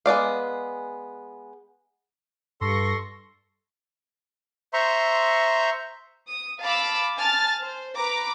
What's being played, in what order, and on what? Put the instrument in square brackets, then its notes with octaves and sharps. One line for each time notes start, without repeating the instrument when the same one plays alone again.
[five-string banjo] G#3 B3 D5 F5
[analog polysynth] G2 C#6 A#6 [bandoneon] A4 C6
[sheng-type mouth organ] C5 E5 A#5 C6 C#6
[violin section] D#6
F5 A5 B5 D6 E6
G#5 A5 F6 A6
C5
B4 A#5 D6